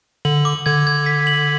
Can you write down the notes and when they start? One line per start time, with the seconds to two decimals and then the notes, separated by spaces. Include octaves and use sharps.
0.25 D3 F#7
0.45 D6
0.66 D3 G#6
0.87 G#6
1.06 B6
1.27 F#7